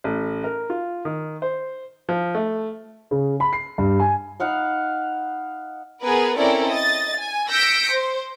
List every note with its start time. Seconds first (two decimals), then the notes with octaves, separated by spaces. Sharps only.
0.04 A1
0.44 A#4
0.70 F4
1.05 D#3
1.42 C5
2.09 F3
2.35 A3
3.11 C#3
3.40 B5
3.53 C7
3.78 G2
4.00 G#5
4.40 D#4 F5 F#5 B5
6.02 B3 G#4 A#4 B4
6.38 C4 C#4 E4 A4 A#4 D5
6.69 D#5 A6
7.17 G#5
7.50 E6 G6 A#6 B6 C#7 D7
7.92 C5